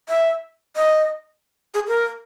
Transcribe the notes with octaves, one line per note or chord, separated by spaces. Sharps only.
E5
D#5
G#4
A#4